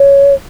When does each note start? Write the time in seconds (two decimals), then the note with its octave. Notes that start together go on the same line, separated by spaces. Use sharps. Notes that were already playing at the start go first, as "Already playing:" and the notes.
Already playing: C#5